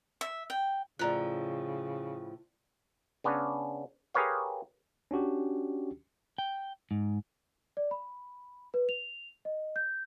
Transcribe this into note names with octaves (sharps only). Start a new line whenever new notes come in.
E5
G5
A2 C#3 F3 D5 A#5 F#6
C#3 B3 C#4 D4
G4 G#4 A#4 B4 C#5 F5
C#4 D4 F#4 G4
G5
G#2
D5
B5
B4
F7
D#5
G6